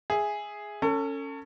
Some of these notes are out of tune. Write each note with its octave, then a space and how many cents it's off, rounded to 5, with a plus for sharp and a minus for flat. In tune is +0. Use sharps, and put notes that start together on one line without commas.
G#4 +0 E5 +0
C#4 +0 A4 +35